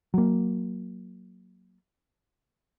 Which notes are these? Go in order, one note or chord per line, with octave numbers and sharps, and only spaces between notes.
F#3 A#3